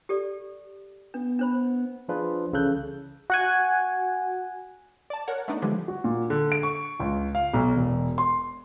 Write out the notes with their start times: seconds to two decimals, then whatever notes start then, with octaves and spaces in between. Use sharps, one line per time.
0.09 G4 A4 D5
1.14 B3 D4
1.39 D4 C5 B5
2.09 F3 D4 F4 G#4 B4
2.53 C2 C#3 E3 A4 F#6 G6
3.30 F#4 F#5 G#5
5.10 D5 A5
5.28 A#4 C#5 F#5
5.48 A3 B3 D4 D#4
5.62 D3 F3 G3 G#3
5.88 F#4
6.04 A#2
6.30 D3
6.52 D7
6.63 C#6
7.00 C#2
7.35 F5
7.54 B1
7.77 E1
8.18 C6